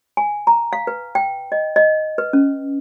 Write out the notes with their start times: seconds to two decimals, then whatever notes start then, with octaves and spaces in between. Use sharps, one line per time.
0.17 G#5
0.47 A#5
0.73 F5
0.87 B4
1.15 G5
1.52 D#5
1.76 D#5
2.18 B4
2.33 C#4